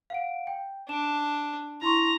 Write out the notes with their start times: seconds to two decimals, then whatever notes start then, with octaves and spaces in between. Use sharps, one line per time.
0.10 F5 F#5 D7
0.47 G5
0.89 D4 D7 E7
1.82 E4 A#5 C6 C#6